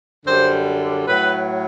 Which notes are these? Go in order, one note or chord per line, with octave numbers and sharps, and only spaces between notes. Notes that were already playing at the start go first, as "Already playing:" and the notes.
F#2 D3 G3 C5
A2 F#3 B4